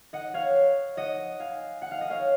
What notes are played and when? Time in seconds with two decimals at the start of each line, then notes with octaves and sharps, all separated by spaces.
0.13 D#5 F#5
0.34 C#5 F5
0.97 D#5 F#5
1.40 F5 G#5
1.82 F#5
1.91 F5
2.01 D#5
2.10 C#5 F5